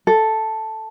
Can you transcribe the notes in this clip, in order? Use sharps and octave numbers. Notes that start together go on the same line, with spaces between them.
A4